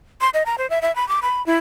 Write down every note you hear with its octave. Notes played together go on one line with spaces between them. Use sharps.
C6
D#5
A#5
C5
E5
E5
B5
D6
B5
E4